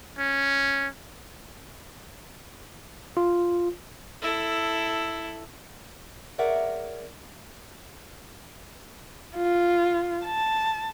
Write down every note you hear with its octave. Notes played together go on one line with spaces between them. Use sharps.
C#4
F4
E4 A4
G#4 A#4 C#5 D5 E5 F#5
F4
A5